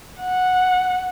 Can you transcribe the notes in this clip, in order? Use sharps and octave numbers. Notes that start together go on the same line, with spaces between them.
F#5